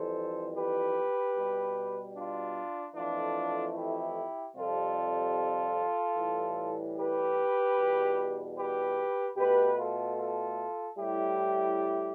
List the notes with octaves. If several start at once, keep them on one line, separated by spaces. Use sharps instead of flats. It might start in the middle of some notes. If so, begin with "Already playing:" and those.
Already playing: F2 E3 G3 A4 C5
G4 B4
B2 G3
D4 F4
F2 E3 A3 D4 F4
E4 G4
F2 C3 G3 F4 A4
A2 E3 G3
G4 B4
E2 B2 G3
G4 B4
B2 A3 G4 B4
F4 A4
F4 A4
A2 G3 E4 G4